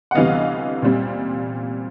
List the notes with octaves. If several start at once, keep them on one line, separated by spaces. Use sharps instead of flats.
F#5
D2 C3 E3 G3 B3 D#5 F5
A#2 G3 C4